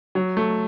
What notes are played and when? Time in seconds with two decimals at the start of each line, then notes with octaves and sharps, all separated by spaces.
0.15 F#3
0.37 A3